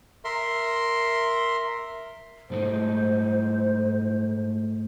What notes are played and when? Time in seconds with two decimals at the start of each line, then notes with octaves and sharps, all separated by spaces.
0.24 A#4 E5 C6
2.50 G#2 A3 D#4 C5